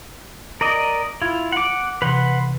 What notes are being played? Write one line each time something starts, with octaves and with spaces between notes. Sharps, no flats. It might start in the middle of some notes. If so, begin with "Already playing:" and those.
A#4 D5 D#5
E4 F4 G#6
F#5 D6
C3 E3 B4 F#5 C6